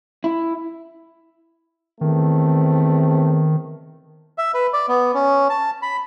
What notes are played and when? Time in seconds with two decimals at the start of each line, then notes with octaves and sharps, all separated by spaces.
0.24 E4
2.01 E2 D#3 A3 C4
4.38 E5
4.54 B4
4.73 D5
4.88 B3
5.14 C#4
5.50 A5
5.82 B5